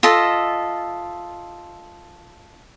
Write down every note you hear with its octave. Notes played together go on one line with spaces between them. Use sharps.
F4 A4 D#5 E5